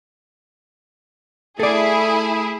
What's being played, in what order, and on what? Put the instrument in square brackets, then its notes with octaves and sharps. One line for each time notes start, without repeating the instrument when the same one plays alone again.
[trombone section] A3 [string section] E4 G#4 [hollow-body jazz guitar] A4 D5